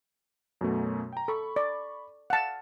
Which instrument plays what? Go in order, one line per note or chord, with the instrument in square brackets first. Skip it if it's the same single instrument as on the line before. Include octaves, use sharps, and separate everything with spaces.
[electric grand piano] F#2 B2 A3
G5 A#5
[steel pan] A4 [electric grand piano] B5 C#6
[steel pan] D5
[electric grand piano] F5 [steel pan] F#5 A5